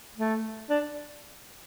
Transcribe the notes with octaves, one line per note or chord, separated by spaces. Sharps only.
A3
D4